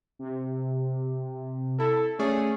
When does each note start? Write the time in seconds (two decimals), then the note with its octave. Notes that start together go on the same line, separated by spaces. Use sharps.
0.19 C3
1.80 E4 A4
2.19 A3 C#4 G#4 D5